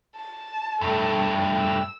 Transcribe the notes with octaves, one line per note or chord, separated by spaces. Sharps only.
A5
G2 A3 A4
E6